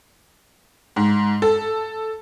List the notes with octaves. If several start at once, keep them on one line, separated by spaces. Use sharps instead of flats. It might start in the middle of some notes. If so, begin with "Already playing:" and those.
G#2
A4